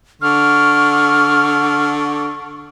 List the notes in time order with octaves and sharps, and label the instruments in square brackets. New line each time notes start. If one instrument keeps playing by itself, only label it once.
[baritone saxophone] D3 [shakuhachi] C#6 [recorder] F6